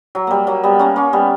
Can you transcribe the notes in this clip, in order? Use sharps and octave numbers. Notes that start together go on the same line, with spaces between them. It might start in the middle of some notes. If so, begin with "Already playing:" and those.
F#3
G3 A#3
F#3 A#3
G3 B3
A#3 C#4
A#3 C#4
G3 B3